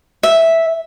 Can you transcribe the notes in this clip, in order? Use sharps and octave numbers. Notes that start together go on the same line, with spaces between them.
E5